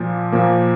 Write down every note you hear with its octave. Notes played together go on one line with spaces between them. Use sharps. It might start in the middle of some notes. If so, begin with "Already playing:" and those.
Already playing: A#2 F3 A#3
A#2 F3 A#3